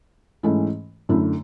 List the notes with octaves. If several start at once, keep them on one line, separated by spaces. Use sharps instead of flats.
G#2 E3 A3 C#4 E4
F#2 D3 A3 E4